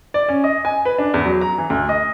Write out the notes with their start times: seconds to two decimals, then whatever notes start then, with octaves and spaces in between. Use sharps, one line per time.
0.14 D5
0.29 C#4
0.44 D#5
0.65 G#5
0.85 B4
0.98 D4
1.14 E2
1.26 F#3
1.41 A#5
1.58 E3
1.70 D2
1.89 D#5